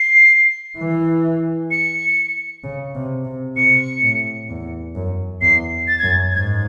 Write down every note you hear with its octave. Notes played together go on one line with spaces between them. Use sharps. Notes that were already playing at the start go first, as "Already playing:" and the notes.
Already playing: C7
E3
C#7
C#3
C3
C3
C3 C#7
A2
E2
F#2
E2 C7
A6
F#2 G#6
A6
G#2 G#6